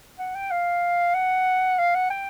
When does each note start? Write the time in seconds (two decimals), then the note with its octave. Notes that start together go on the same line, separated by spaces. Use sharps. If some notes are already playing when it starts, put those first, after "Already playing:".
0.19 F#5
0.35 G5
0.51 F5
1.15 F#5
1.79 F5
1.95 F#5
2.11 G5